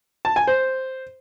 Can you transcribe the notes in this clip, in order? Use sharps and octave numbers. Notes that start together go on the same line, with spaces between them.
A5
G#5
C5